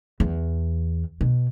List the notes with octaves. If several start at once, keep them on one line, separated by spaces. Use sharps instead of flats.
E2
B2